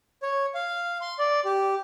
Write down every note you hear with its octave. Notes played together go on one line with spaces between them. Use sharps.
C#5
F5
C6
D5
G4